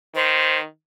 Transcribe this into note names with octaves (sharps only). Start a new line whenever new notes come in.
D#3 C5